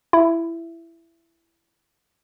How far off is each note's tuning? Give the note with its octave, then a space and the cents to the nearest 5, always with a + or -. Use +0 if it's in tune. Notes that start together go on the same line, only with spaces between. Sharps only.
E4 +15